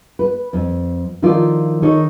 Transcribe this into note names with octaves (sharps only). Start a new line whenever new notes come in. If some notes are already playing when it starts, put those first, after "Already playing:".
B4
F2
D#3 F3 E4 F4 A4 D5
D#3 D#4 A4 C#5